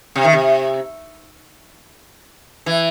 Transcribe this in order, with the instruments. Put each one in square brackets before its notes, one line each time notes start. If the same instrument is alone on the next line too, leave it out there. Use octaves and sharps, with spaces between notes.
[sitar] C3
D#3
C3
E3